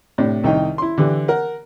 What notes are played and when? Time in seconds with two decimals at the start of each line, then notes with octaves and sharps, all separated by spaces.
0.18 A2 C3 D4
0.44 C2 D#3 D#4 G5
0.78 E4 C6
0.98 D3 E3 G4
1.28 A#4 F#5